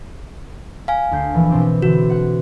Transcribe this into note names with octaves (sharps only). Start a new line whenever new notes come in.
F5 G#5
D2 G6 C7
A#1 E3
B2 C4 G4
D3 E3 F#4
F#5 F#6